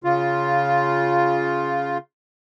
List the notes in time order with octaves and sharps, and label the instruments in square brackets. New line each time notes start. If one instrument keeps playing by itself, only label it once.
[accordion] C#3 F4